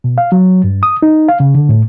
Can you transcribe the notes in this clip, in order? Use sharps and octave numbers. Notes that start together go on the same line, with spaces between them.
B2
F5
F#3
G2
D#6
D#4
F5
C#3
D3
A2